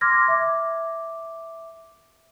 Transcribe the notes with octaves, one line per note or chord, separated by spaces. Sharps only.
C6 D6 F6 G#6 A#6
E5 D6